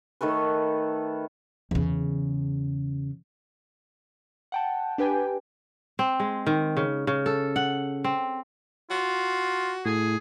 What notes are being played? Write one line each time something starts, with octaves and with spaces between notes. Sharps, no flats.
D#3 A3 A4 B4
E2 C#3
F#5 G5 A5
D4 G4 B4 G5 G#5
C4
G#3
D#3
C#3
C#3
A4
F#5
C4
F4 F#4
A2 G#4